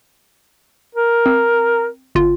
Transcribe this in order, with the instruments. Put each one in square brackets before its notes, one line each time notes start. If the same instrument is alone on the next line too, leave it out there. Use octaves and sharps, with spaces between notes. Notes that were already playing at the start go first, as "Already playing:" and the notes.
[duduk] A#4
[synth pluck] C4
G1 F4